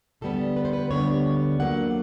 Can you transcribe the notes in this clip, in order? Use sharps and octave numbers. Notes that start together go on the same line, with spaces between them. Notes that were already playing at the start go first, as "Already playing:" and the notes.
D2 D3 G3 B3 A4
B4
C5
B4
D2 D3 G3 B3 C#5
D2 D3 F#3 A#3 F#5